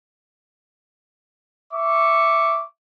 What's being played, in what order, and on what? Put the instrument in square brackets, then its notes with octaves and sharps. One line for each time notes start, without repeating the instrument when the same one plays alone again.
[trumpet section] E5 C#6 D6